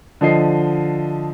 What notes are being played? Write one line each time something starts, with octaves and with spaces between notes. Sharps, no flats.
D3 F3 D#5 C7